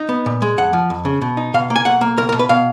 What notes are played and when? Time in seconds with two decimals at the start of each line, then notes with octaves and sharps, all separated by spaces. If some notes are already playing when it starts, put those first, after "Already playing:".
Already playing: D#4
0.09 B3
0.26 A#2
0.42 G#3
0.57 F2 F#5
0.73 F3
0.90 F2
1.05 C#3
1.22 B2
1.37 D#4
1.54 B2 F5
1.70 A#3
1.76 G#5
1.85 B1 F#5
2.01 A#3
2.17 B1 A#4
2.29 A#4
2.34 B2
2.39 B4
2.49 B2 F5